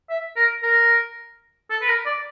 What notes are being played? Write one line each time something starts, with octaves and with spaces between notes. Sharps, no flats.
E5
A#4
A#4
A4
B4
A#4
D5